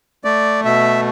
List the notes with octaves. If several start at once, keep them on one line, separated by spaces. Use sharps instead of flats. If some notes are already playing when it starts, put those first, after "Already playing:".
A3 D5
B2 E5